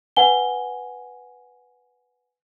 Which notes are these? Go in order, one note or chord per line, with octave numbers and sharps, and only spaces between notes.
B4 F#5 G#5 G7